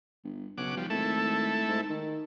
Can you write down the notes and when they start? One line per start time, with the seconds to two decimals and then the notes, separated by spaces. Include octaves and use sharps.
0.24 G1
0.58 B1 C#3 F#5 D6
0.77 F3 G3
0.90 G#1 A3 E4 A4
1.68 G#2
1.90 D#3